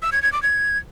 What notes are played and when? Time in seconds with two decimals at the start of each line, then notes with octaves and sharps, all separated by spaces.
0.02 E6
0.12 G#6
0.22 G#6
0.33 D6
0.43 G#6